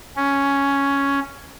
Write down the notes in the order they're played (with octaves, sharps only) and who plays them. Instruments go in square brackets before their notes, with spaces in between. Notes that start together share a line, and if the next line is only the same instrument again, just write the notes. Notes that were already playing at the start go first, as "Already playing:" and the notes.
[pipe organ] C#4